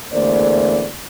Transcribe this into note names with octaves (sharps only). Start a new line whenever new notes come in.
E2 D3 A3 A#3 C5 D5